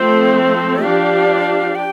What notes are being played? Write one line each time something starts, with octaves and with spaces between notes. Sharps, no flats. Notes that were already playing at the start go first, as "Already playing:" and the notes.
Already playing: F3 A3 C4 A4 C5
F3 D4 G4 D5 F5
G5